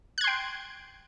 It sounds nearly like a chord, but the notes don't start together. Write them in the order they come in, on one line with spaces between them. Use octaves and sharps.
F#6 G#6 C6 G5